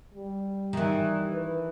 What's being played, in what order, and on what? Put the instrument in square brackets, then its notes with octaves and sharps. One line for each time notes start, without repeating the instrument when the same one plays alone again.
[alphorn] G3
[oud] D#3 E3
[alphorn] B4